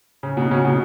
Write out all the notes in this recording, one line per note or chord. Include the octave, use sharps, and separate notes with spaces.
C#3
B2
C#3
B2